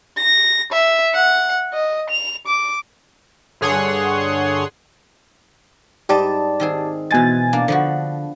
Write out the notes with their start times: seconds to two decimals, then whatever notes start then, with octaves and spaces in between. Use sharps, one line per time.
0.17 A#6
0.73 E5
1.14 F#5
1.74 D#5
2.10 F7
2.47 D6
3.61 G2 D3 G#4 C#5 F#5 C6
6.09 G#2 G3 G4 D5 D#5 A5
6.60 D#3 C4 G#4
7.11 B2 E3 G#3 G#5 A6
7.53 A#3 D4
7.68 D3 F3 B3 F#4